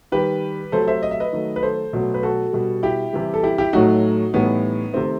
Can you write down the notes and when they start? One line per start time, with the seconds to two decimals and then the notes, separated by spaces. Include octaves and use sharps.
0.12 D#3 G3 G4 B4
0.72 C3 F#3 A3 A4 C5
0.87 C5 E5
1.03 D#5
1.11 E5
1.20 B4 D#5
1.33 D#3 F#3 A3
1.56 B4
1.63 A4 C5
1.93 B2 F#3 A3
2.14 B4
2.23 F#4 A4
2.53 B2 G3
2.83 E4 G4
3.13 C3 E3 G3
3.34 A4
3.43 E4 G4
3.58 E4 G4
3.73 A2 F#3 A3 D#4 F#4
4.33 A2 E3 G3 B3 D#4
4.94 C3 D#3 A3 C4